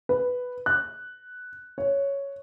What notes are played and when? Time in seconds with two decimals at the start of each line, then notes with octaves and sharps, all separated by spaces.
0.09 B4
0.66 F#6
1.78 C#5